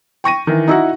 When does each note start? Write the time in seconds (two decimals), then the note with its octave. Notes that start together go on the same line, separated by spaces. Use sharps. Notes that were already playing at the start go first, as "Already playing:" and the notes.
0.24 G5 C#6 A#6 D#7
0.47 D#3 E3
0.68 D#4 E4 F#4 F#5